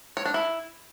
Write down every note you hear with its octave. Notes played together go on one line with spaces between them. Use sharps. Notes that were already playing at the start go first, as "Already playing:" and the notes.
C#5
D4
E4